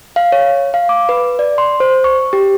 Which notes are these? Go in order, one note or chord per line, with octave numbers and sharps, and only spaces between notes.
F5
C#5
F5
D6
B4
D5
C6
C5
C#6
G4